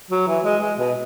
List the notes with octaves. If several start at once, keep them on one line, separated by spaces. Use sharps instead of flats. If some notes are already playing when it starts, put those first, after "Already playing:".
F#3
E3
G#3
G#3
B2